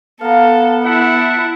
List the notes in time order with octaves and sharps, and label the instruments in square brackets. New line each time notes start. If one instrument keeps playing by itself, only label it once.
[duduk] B3 [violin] A4 [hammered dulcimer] F5 A#5
[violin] E4 [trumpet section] E5 F#5 A5